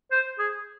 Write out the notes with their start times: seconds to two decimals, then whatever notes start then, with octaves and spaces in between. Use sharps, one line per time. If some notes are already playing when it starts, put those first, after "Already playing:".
0.12 C5
0.39 G#4